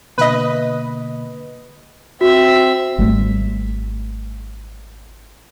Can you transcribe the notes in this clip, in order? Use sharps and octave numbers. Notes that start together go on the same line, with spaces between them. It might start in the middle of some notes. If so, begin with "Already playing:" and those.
B2 D3 A#3 B4 D#5
C4 F#4 E5
G#1 G3 A3